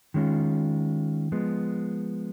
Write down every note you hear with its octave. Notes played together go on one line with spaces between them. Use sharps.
D#3 G#3 C#4 F4
F3 G#3 B3